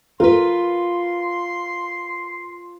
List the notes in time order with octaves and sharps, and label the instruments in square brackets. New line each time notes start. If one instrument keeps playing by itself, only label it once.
[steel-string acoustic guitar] F4 B4 [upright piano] A#4 [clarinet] C6